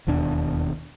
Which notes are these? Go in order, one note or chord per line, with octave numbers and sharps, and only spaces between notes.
E1 D#2 B2 D4